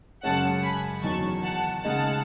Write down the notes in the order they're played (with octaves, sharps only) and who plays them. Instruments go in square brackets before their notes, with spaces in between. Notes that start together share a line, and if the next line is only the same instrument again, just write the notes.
[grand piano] F#2 C#3 G#3 C#4 [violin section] F#5 A5
[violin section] G#5 B5
[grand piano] E2 D#3 F#3 [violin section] A5 C#6
[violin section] F#5 A5
[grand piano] C#3 G#3 D#4 [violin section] F#5 A5